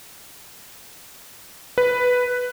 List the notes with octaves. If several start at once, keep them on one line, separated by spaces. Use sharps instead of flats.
B4